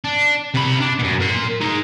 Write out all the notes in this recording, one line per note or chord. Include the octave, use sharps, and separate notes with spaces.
D4
C3 B5
D4
F#2 B2
A#4 C6
D#4 G#4